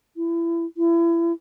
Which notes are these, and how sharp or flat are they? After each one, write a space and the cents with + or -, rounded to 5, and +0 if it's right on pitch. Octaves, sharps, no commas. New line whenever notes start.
E4 +30
E4 +30